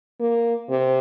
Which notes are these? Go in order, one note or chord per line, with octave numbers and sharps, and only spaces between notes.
A#3
C3